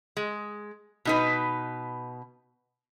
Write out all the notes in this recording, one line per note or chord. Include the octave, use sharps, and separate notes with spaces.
G#3
B2 D#4 B4